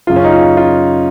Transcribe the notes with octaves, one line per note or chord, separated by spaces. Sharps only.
F#2 C#3 F4
C#4
D#4
F4
F4